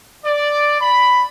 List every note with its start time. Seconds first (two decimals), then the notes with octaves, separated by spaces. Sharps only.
0.25 D5
0.80 B5